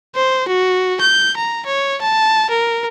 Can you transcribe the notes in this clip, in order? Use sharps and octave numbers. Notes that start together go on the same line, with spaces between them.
C5
F#4
G6
A#5
C#5
A5
A#4